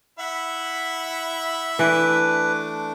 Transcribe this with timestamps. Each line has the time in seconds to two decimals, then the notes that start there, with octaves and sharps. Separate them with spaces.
0.19 E4 E5 F#5 B5
1.79 E3 A3 D4 B4 D6